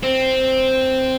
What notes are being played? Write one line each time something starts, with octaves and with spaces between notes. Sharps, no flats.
C4